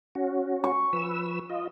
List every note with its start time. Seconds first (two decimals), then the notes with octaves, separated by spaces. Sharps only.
0.15 C#4 F#4
0.64 C#6
0.93 F3 B4 E6
1.50 F4 D#5